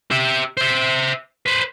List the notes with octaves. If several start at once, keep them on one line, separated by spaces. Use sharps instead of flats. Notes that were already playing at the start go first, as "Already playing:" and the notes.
G4 E5
C5 E5
B4 C5